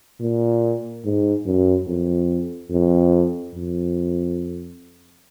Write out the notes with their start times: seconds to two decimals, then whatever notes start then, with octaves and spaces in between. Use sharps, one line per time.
0.20 A#2
1.05 G#2
1.46 F#2
1.88 F2
2.70 F2
3.54 F2